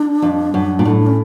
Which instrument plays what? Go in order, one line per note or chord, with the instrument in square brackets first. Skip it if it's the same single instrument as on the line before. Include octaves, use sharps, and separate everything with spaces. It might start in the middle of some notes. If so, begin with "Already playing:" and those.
Already playing: [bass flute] D4
[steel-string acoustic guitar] F2
F#2
A#2
A2
[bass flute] C#4